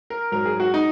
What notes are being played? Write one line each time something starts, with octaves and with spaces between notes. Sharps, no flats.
A#4
G#2 F#3 A#4
G#4
F#4
D#4